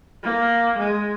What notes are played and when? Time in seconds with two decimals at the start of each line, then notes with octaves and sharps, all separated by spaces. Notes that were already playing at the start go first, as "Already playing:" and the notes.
0.23 A#3
0.77 G#3